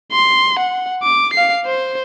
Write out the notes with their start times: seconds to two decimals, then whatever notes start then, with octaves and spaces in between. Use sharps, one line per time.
0.12 C6
0.59 F#5
1.03 D6
1.33 F5 C7
1.65 C5